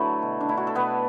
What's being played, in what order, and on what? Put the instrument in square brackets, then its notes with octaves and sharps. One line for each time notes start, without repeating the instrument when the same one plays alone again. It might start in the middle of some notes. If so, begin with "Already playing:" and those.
Already playing: [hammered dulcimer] D3 F#3 A3 E4 A4 B4
B2
D4
A3 E4
F#4
A4
B2 B3 B4